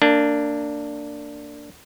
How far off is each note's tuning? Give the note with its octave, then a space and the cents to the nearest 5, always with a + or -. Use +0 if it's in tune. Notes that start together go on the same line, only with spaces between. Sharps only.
A#3 -30 D4 -5